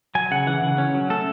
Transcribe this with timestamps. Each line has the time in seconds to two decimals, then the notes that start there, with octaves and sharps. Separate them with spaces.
0.15 F#3 G#5
0.31 C#3 F#5
0.47 E3 F#5
0.62 C#3
0.78 C#4
0.94 F#3
1.10 A3 A4